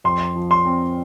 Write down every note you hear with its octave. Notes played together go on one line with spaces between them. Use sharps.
F2 C6
F3
C6
C4